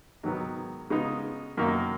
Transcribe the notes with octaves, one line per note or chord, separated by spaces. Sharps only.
G#2 D#3 F#3 B3
C#3 G#3 B3 D#4
F#2 D#3 A#3 D#4